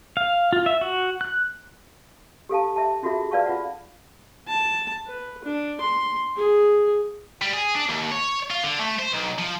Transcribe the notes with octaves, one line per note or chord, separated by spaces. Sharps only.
F5
F4
E5
F#4
F#6
G4 A4 F5 A5
E5 A5
C#4 F4 F#4 G#4 A4 E5
B4 D5 F5 A5 C#6
F4 B4 F5 F#5
A5
B4
D4
C6
G#4
G3
G#4
D4
D#2
C#5
F4
D3
A3
C5
B1
F3